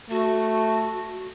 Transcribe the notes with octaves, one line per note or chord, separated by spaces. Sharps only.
A3 F#4